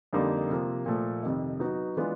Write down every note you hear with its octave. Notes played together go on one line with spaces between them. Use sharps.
F2 D3 G3 A#3 D#4
C3 F3 A#3
A#2 F3 A3
F2 C3 D#3
F#3 B3 D#4 F#4
E3 G#3 B3 D4 F4